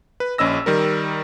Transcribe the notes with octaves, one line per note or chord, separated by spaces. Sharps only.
B4
A#1 C#4 D#5 E6 A#6
D#3 G3 A#4